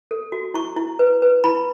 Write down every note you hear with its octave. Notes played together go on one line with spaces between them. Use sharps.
A4
F#4
E4 C#6
E4
B4
B4
E4 B5